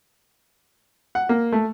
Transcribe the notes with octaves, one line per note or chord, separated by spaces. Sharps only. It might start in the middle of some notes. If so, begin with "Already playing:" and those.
F#5
A#3
A3